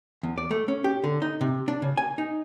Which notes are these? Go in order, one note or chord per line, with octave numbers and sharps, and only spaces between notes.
E2
D5
A3
C#4
G4
D3
D#4
C3
D4
C#3
G#5
D#4